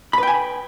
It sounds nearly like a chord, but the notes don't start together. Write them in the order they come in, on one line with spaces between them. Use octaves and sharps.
B5 B4 G5 G#5